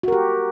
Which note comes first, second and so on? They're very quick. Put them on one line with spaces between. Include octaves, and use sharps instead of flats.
F#4 A#4 G4